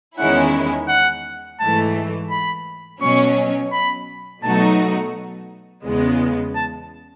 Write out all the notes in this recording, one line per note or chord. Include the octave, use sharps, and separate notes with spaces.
E2 D#3 G#3 C#4 E4 F#5
F#5
G#2 E3 A3 A5
B5
B2 F#3 C#4 C#6
B5
B2 F#3 A3 D#4 F#4 A5
E2 C#3 G#3 B3
A5